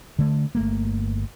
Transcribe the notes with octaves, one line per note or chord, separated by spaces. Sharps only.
D3 A3
G1 A3 A#3